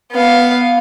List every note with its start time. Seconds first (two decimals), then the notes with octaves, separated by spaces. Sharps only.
0.12 B3 F5